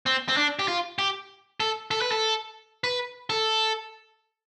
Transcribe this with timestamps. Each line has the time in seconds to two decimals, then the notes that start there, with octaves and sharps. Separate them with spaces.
0.06 C4
0.29 C4
0.37 D4
0.59 G4
0.68 F4
0.99 G4
1.60 A4
1.91 A4
2.01 B4
2.11 A4
2.84 B4
3.30 A4